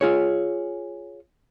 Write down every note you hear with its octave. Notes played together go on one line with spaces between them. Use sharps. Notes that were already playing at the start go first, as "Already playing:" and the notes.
F4 G#4 C#5